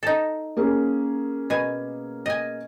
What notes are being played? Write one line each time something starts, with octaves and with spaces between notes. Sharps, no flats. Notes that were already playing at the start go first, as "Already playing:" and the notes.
D#4 A4
A#3 C#4 G#4
B2 G#5
D#5 G#5